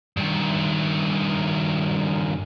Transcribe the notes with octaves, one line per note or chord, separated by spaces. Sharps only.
G2 D#3